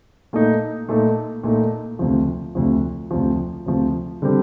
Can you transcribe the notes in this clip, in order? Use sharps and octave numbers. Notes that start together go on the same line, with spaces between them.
A#2 A3 D#4
A#2 A3 D#4
A#2 A3 D#4
D2 C3 F3
D2 C3 F3
D2 C3 F3
D2 C3 F3
D3 G3 C4 G4